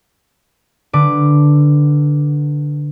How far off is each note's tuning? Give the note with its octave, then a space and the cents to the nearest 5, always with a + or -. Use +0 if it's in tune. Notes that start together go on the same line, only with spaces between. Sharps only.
D3 +0 B4 +0 D6 +5